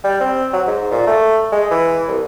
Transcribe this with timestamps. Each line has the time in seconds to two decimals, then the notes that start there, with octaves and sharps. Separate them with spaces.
0.04 G3
0.21 C4
0.53 F#3
0.67 G#2
0.91 A#2
1.07 A3
1.52 G#3
1.71 E3
2.08 C2